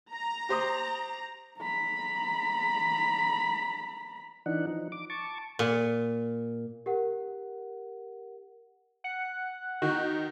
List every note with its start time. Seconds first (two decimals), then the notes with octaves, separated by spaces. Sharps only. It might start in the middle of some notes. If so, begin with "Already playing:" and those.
0.12 A#5
0.49 G4 C5 D#6
1.59 A#5 B5
4.46 E3 D4 D#4 F#5
4.67 F3 D#4
4.92 D6
5.10 A5 C#6 D6
5.59 A#2
6.86 G4 A#4 F#5
9.04 F#5
9.82 D#3 F#4